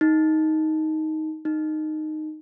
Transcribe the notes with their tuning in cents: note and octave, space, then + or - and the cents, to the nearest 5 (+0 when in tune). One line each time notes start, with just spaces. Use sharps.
D#4 +10
D#4 -10